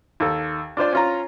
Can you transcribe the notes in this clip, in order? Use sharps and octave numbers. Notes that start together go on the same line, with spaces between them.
D#2 A4
D4 F4 C5 D5
C#4 F4 A#5